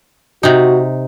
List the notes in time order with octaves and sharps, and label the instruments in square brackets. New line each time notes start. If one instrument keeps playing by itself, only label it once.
[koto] C3 D#4 [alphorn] F#4